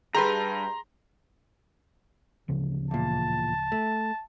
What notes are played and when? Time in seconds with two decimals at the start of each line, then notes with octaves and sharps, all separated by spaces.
0.15 G2 G4 G#4 B4 A#5 C6
2.48 D1 C#3 F3
2.91 E2 A#2 A5
3.72 A3